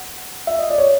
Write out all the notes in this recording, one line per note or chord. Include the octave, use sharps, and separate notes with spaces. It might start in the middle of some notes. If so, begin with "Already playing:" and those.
Already playing: F#5
E5
D#5
D5
C#5